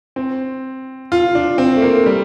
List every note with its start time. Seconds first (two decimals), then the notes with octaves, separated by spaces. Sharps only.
0.16 C4
1.12 F4
1.35 D4
1.58 C4
1.77 A3
1.82 A#3
2.06 G3